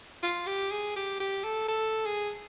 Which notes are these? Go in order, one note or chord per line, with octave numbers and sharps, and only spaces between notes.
F4
G4
G#4
G4
G4
A4
A4
G#4